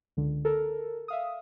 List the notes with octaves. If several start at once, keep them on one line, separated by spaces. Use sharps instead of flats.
C#2 D3
A4 A#4
E5 F5 D#6